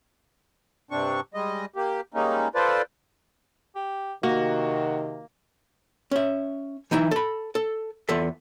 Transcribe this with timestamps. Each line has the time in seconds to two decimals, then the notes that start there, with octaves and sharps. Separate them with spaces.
0.91 G2 C3 C4 D4 C#6
1.34 G3 G#3 D#5
1.76 A#3 G4
2.14 G3 G#3 A#3 C#4 D#4
2.55 F4 A4 B4 C5 D5
3.75 G4
4.23 C3 D#3 A#3 F#4
6.11 C#4 E5
6.91 E3 D#4 E4 E5
7.11 A4 B5
7.55 A4
8.09 E2 F4 A4 E5